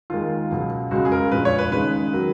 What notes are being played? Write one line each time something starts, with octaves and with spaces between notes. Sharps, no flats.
D#2 D#3 G#3 F4
C#2 B2 F#3
C#2 C#3 G#3 F#4
G#4
A#4
A#1 A#2 G#3 B4
C#5
B4
D#2 C#3 G#3 B4
D#3 F#3